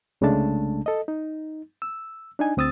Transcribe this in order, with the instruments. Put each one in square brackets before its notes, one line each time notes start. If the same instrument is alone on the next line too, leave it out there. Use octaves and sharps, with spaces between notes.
[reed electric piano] C2 C#3 G#3 A3 D4 A5
A4 D#5
D#4
E6
D4 D#4 G#5
D2 C4 D#6 E6 A6